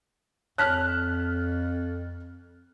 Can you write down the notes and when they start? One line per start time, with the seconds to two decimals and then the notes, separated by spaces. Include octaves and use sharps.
0.58 F2 C#5 A5 F6 F#6 B6